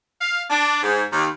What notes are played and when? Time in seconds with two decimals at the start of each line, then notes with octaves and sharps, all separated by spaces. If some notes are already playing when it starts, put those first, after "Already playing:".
0.21 F5
0.50 D4
0.83 G#2
1.12 D#2